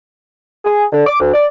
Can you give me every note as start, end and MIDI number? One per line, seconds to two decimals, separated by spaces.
0.65 0.84 68
0.92 1.04 50
1.06 1.18 86
1.20 1.33 38
1.33 1.46 74